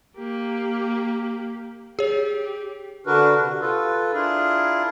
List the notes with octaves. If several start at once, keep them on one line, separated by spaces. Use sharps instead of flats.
A#3 G4
G4 G#4 C#5
D3 D4 F#4 A#4 B4
C3
F4 A4 B4
D4 E4 F4 G#4 A#4